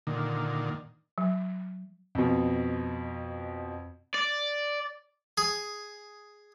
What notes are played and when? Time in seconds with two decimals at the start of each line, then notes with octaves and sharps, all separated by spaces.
0.07 A#2 D3 D#3
1.18 F#3
2.15 F2 B2
4.15 D5
5.38 G#4